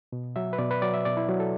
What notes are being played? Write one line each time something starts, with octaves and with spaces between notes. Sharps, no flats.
B2
F#3 E5
B4
B2 D5
B4
F#3 D5
E5
B2 D5
E4
F#3
A4